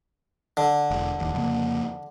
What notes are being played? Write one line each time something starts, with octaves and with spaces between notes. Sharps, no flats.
D3
E1
D1 D#2
F2 C#3 A#3